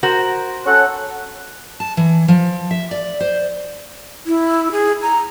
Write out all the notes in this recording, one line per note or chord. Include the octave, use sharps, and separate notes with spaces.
F#4 A#4 C5
C#4 A4 F#5
A5
E3
F3
E5
D5
C5
E4
G#4
A#5